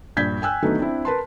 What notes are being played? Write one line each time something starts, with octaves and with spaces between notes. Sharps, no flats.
A#1 G2 G6 G#6 B6
G5 G#5 E6 F#6
D3 D#3 F#3 A3 B3 D#4
C4 D4 E4
A#4 B4 A5 C6